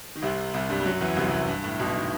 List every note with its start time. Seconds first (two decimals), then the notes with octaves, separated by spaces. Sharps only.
0.15 D#3
0.22 C2 C3
0.54 C2 C3
0.69 G2 G3
0.80 G3
0.85 F#2 F#3
1.01 E2 E3
1.16 C2 C3
1.27 C2 C3
1.48 G2
1.64 A2
1.79 B1 B2
1.95 D#3